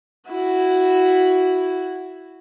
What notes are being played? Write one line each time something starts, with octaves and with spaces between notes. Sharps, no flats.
E4 F#4